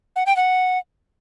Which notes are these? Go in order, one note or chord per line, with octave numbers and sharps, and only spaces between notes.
F#5
G5
F#5